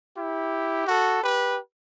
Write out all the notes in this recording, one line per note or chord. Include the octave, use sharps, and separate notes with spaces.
E4 G4
F#4 A4
G4 B4